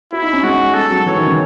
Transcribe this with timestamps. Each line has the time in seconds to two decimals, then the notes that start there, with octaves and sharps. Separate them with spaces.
0.12 E4 F#4
0.22 D#4
0.33 C#4
0.43 G#3 F#4
0.74 G#3 A4
0.90 F#3
1.06 E3 C#5
1.16 D#3
1.26 C#3